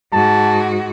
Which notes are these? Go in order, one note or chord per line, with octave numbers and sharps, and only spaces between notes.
G#2 F#4 A5